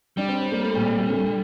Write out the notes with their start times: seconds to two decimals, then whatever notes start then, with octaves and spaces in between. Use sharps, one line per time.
0.17 G3 D4
0.28 C4
0.40 C4
0.52 A#3
0.63 A3
0.75 A#2
0.86 A#2
0.98 C3
1.09 D3